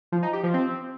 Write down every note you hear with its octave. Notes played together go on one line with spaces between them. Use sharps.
F3
D#4
G4
F3
C4